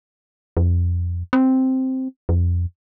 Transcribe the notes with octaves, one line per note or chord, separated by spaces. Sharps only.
F2
C4
F2